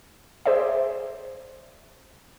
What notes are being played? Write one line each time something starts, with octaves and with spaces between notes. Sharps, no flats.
G#4 C5 D5 E5